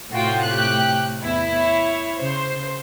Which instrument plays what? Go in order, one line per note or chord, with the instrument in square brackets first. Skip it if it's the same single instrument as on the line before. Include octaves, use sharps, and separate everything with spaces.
[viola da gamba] A2 C3 A3 [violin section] F4 F#4 G5
[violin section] G4 F#6
[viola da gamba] E2 [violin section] E4
[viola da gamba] C#5
[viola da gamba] C#3 [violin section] C5